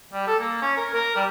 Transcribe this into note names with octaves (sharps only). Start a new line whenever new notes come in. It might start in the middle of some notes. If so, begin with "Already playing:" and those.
G3
A4
A#3
C#4
A#4
A#4
G3